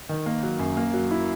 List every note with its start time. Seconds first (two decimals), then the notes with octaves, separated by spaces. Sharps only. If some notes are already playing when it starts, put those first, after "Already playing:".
0.09 D#3
0.26 A#3
0.43 F#3
0.59 F#2
0.77 A#3
0.94 F#3
1.11 E4